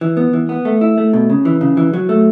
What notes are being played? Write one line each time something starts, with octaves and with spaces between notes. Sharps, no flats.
E3
B3
E3
B3
A3
E4
A3
B2
C#3
E3
C#3
E3
F#3
A3